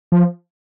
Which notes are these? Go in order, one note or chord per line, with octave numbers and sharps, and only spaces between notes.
F3